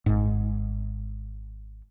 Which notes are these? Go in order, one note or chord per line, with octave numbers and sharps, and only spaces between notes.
G#1 G#2